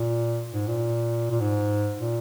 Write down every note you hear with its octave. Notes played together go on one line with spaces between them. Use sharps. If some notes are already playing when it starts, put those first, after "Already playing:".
Already playing: A#2
G#2
A#2
A#2
G#2
A#2